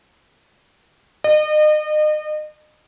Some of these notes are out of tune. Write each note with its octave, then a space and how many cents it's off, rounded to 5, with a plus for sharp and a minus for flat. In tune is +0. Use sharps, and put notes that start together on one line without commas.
D#5 -35